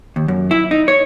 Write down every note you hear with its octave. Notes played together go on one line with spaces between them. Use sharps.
D#2
F#2
E4
D#4
C#5